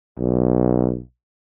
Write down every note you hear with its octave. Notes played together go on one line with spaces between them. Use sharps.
B1